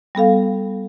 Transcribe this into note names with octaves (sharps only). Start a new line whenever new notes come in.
G3 B3 A4 F5